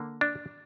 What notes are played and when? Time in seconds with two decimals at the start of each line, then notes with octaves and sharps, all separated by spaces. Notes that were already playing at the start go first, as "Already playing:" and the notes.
Already playing: D3 A#3
0.21 D4